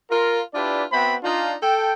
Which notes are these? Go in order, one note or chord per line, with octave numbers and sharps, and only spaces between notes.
F4 A#4
D4 E4 F4 G4 B4 D5
B3 C4 F#4 E5 G5 B5
D4 D#4 F4
A4 G5